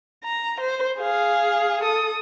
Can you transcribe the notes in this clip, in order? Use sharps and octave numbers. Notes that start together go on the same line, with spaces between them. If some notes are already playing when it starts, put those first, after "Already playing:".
A#5
C5
G#4 F5
A4 D#6